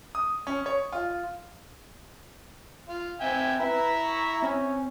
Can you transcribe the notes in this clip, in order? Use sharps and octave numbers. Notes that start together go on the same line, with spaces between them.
D#6
C#4
C#5
F4
F4
C4 E5 G5 G#5
E4 B4 E5 A#5
C#6
C4 C#4